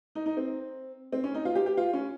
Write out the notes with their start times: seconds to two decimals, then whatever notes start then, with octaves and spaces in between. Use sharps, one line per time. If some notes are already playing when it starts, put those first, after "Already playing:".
0.15 D#4
0.26 D#4
0.37 C4
1.12 C4
1.24 C#4
1.35 D#4
1.45 F4
1.55 G4
1.66 G4
1.77 F4
1.93 C#4